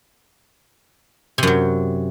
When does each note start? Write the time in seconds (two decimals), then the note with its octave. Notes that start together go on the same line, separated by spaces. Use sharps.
1.38 C3
1.43 F#2
1.47 F#3